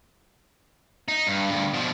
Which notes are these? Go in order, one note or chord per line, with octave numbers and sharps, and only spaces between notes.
D#4
G2
D2 G2
B2 F3